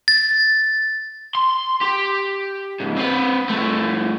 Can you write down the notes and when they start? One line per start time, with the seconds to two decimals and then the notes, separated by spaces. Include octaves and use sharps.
0.08 A6
1.35 C6
1.81 G4
2.80 C#2 G#2
2.97 C4 B4
3.49 G2 A3